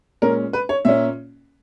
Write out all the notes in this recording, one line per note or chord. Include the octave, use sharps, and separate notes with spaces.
A#2 G#3 C#4 A#4
B4
C#5
A#2 A#3 C#4 E5